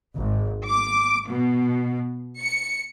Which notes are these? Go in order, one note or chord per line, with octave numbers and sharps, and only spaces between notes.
G#1
D6
B2
C#7